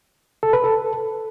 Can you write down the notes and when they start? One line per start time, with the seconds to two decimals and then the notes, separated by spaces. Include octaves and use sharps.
0.43 A4
0.53 B4
0.64 A4